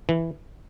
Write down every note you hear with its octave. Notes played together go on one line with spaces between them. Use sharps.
E3